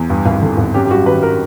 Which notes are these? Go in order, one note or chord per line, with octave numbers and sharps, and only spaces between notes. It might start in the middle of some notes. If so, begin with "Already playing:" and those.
Already playing: E2
G2
G#1
D3
G#1
F#2 G4
G4
G3 F#4
D#3 B4
A#4